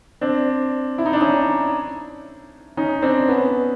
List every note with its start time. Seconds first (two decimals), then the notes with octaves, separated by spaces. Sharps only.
0.21 C4 D4
0.98 E4
1.06 D#4
1.13 D4
1.21 C#4 D#4
2.77 C#4 D#4
3.02 C4 D4
3.29 B3 C#4